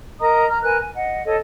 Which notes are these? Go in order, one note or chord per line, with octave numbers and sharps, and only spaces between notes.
A#4 D#5 A#5 D#6
A#5 F6
A#4 B4 G#5 F#6
G#5
D#5 F#5
A4 C#5 D#5